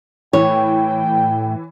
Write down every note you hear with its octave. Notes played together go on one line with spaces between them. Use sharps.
A2 E3 C#5 G5